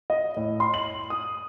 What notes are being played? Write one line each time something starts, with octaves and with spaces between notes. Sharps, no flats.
D#5
A2
C6
F#7
D#6